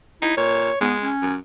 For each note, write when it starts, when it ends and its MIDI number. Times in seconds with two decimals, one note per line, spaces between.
0.22 0.35 63
0.22 0.34 64
0.37 0.70 46
0.37 0.79 73
0.81 1.09 56
0.81 0.95 59
1.03 1.35 61
1.22 1.37 42